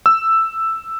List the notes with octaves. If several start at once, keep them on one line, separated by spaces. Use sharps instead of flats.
E6